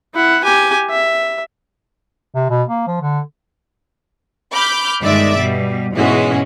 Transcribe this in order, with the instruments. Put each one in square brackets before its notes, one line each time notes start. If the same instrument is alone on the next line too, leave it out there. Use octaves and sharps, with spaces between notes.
[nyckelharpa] E4 F#5
G4 G#5
E5
[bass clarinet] C3
B2
A#3
F3
D3
[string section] B5 D6 F6 G6 B6
G1 D#3 G#3 D5 E5 D6
B2 G3
G#2 B2 E3 G#3 C#4 F#4